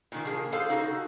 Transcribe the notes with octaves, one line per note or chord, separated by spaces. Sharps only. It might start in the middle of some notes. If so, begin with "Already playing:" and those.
A#2 D#3 A#3
F3 A#3 G#4
G#4 A4 C5 F5
D#4 F#4 G#4 A4